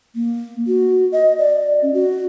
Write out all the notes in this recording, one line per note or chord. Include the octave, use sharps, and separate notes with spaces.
A#3
F#4
D#5
D5
C#4
F#4